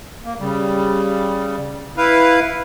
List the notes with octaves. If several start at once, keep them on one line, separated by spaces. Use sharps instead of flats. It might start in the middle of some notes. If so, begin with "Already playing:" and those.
A#3
C#3 G3
E4 B4 F5